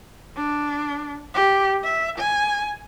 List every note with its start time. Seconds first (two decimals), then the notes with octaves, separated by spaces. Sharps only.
0.37 D4
1.34 G4
1.84 E5
2.18 G#5